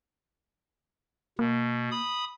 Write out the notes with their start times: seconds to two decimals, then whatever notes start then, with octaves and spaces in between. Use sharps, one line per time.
1.39 B2 A#3
1.91 B5 D#6